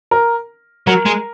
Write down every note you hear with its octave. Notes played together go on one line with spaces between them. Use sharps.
A#4
F#3 A#4
G#3